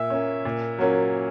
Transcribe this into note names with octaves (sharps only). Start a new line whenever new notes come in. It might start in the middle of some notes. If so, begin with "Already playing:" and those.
Already playing: A#2 E5
A#3 C#4
A#2
F#3 A#3 C#4